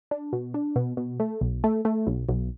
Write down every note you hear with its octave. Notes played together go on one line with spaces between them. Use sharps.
D4
B2
D4
B2
B2
A3
B1
A3
A3
B1
B1